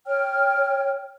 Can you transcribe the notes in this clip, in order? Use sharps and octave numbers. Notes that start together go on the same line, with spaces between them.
C#5 G5 F6